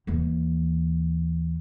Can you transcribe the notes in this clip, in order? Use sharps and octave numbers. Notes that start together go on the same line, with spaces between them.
D#2 E3